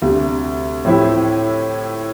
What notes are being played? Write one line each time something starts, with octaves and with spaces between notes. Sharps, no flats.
D2 C3 G3
A2 F3 C4 E4 G4